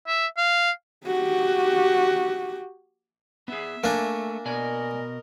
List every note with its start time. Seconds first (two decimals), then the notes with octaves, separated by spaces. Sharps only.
0.07 E5
0.37 F5
1.07 F#4 G4
3.48 B3 G#4 E5
3.84 A3 A#3 D4 G#5
4.46 B2 A#4 D5 D#5 G#5